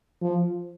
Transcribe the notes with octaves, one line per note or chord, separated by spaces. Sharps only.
F3